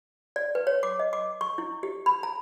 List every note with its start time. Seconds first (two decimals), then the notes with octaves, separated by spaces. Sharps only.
0.36 D5
0.55 B4
0.67 C#5
0.83 D6
0.99 D#5
1.13 D6
1.41 C#6
1.58 E4
1.83 G4
2.06 B5
2.23 A#5